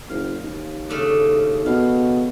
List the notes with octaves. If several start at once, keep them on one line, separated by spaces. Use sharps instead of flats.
F#1 F5
D#2
C#3 A3 D4
B2 F5